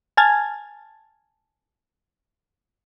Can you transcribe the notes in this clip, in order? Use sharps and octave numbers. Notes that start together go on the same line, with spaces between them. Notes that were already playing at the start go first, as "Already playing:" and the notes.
G#5 A5 F6 G#6 A6